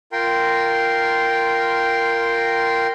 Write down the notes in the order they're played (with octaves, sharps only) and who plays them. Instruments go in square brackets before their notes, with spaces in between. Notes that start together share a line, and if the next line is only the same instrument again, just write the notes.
[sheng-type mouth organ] F4 A#4 G5 C6